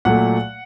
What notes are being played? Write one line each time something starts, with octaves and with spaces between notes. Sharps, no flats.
A#2 F#3 A3 F#5